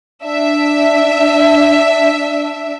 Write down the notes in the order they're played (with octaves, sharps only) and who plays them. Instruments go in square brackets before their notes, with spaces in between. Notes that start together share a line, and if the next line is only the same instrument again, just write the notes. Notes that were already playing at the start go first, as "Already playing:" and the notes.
[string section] D4 E5